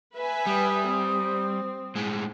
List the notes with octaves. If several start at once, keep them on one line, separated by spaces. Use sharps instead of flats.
B4 E5 G#5
G3 D#6
C4
A2 G#3